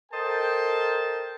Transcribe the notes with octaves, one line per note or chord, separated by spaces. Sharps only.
A4 A#4 C5 D#5 G5 A5